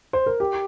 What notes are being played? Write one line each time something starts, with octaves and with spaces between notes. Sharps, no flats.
C5
A#4
G4